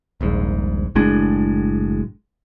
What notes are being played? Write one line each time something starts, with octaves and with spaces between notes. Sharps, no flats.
D#1 A#1 G#2
F#1 A2 G#3 D4